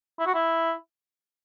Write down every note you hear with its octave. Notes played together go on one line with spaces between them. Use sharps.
E4
F#4
E4